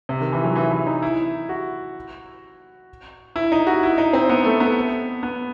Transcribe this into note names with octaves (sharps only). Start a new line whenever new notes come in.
C3
D#3
E3
F#3
E3
E3
D#4
E4
F#4
E4
D#4
F#4
E4
D#4
C4
B3
A3
B3
B3